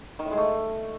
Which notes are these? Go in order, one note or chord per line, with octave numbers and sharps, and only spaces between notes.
D#3
A2
G#3
A3